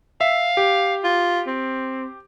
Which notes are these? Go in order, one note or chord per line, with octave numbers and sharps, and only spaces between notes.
E5 F5
G4
F4
C4